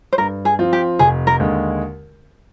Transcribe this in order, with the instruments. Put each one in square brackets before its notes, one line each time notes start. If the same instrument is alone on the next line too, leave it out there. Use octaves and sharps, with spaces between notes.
[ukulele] C5
[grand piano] G2 [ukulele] A#4
[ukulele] G#4
[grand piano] F3 C4 F4
[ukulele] G4
[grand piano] F1 [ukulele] G#4
[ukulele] A#4
[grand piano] D#2 D3 G#3